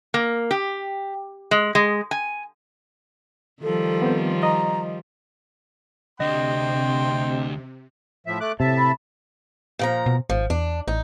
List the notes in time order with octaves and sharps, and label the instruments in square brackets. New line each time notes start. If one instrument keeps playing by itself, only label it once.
[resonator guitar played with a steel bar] A#3
G4
G#3
G#3
G#5
[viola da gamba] D#3 F3 G3 [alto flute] A4
[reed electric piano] B3 C4 C5
[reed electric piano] D#5 [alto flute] A#5
[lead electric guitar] D2 D4 [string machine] C3 [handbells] D#5 [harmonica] G5 C6
[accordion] A2 F3 E5
A3 D6 F#6
[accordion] A2 E5 A5 [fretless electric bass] C3
[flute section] B5
[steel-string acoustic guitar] A#2 F3 A#5
[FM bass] B2
[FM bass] G#1 [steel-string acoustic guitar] F3
[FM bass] E2 [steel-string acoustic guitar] D4
[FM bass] A1 [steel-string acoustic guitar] D#4